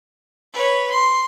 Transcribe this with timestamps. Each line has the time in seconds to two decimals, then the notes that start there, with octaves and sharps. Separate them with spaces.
0.53 B4 C#5
0.90 C6